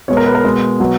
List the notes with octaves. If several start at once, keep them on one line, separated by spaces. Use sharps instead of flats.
B2 G#3 B3 C#5
A#4
B4
A#4
B2 G#3 B3
B2 F#3 B3